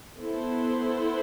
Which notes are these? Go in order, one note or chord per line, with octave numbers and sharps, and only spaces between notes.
B3 E4 A4 C5